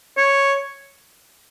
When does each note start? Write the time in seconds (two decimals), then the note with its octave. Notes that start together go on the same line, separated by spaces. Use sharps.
0.18 C#5